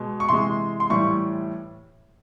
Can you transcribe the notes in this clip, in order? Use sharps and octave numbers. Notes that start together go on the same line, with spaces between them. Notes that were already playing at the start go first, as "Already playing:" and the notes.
Already playing: B2 G#3
C#6
C3 E3 G#3 C6
C6
A2 E3 G3 C#6